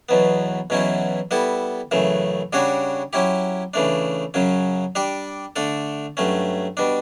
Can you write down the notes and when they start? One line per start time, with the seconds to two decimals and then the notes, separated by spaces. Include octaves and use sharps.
0.09 E2 B2 F#3 B3
0.70 E2 B2 F#3 C#4 E4
1.31 G3 B3 E4 A4
1.91 F#2 C#3 E3 A3
2.53 C#3 G3 D4 F#4 C#5
3.13 F#3 C#4 E4 G4
3.74 C#3 E3 A3 D4
4.34 F#2 C#3 F#3 C#4
4.95 G3 D4 G4 D5
5.56 D3 A3 D4 A4
6.17 G2 F#3 A3 C#4
6.77 B2 G3 D4